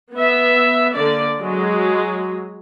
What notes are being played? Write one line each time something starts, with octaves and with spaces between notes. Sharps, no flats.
B3 E5
D3 A#3 D5
F#3 G#3